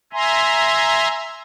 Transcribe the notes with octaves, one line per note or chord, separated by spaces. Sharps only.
E5 G#5 A#5 C6